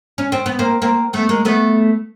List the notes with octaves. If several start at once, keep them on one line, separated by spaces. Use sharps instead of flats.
C#4
C4
B3
A#3 C4
A#3 C4
A3 B3
G#3 A#3
A3 B3